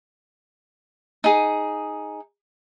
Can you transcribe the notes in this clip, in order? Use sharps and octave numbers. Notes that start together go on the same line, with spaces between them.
D#4 G#4